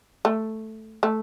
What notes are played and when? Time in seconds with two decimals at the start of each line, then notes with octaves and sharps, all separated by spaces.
0.25 A3
1.03 A3